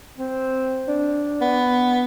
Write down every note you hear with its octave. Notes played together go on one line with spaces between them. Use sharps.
C4
D4
B3